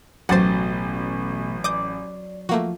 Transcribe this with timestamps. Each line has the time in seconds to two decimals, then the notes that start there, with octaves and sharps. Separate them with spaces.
0.29 A1 B2 F#3 A3 G4 C5 F#5 A6
1.64 D5 D6 D#6 G6
2.49 F3 A3 A#3 F#4